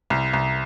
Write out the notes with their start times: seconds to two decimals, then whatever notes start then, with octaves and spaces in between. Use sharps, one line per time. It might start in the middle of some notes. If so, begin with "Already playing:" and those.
0.10 C2
0.33 C2